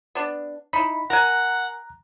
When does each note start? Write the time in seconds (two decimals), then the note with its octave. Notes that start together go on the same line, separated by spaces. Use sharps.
0.15 B3 D4
0.73 D#4 E4 B5
1.10 A#4 F#5 G#5 A#5 F#6